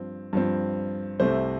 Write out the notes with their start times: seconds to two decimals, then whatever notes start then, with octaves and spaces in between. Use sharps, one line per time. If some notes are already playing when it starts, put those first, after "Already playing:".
Already playing: G2 F3 C4
0.33 G2 F3 C4
1.20 C2 C3 A3 C4 C5